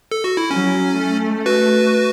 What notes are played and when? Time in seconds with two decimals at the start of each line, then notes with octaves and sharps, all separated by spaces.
0.12 A4
0.24 F#4
0.37 E4
0.51 F#3 C#4
0.98 A3
1.46 F#4 B4